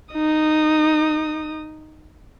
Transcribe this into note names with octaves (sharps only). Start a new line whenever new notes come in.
D#4 D#6